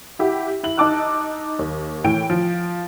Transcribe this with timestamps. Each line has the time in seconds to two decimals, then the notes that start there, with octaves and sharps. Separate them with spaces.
0.19 E4 G4 F#5
0.63 E4 F#7
0.78 D#4 D#5 A5 D6 E6 F#6
1.59 D#2
2.04 A2 E3 G5 D7
2.30 F3